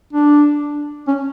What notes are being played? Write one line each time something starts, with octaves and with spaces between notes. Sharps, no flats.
D4
C#4